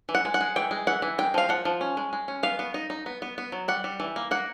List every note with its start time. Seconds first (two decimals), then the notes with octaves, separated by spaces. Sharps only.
0.09 E3
0.15 F#5
0.25 G#3
0.34 F#5
0.41 G#3
0.56 E3 G5
0.71 G#3
0.87 E3 F#5
1.02 E3
1.18 G#3 G5
1.34 F3 F5
1.49 F3 F#5
1.65 F3
1.81 C#4
1.97 G#3
2.13 G#3
2.28 C#4
2.43 B3 F5
2.59 B3
2.74 D#4
2.90 D#4
3.06 B3
3.22 B3
3.38 B3
3.52 F#3
3.68 G3 F#5
3.84 G3
4.00 E3
4.16 A#3
4.31 A#3 F#5